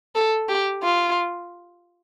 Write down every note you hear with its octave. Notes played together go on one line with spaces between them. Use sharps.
A4
G4
F4